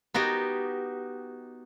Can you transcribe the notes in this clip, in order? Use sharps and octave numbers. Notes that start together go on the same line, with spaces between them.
B3 D#4 F#4 G4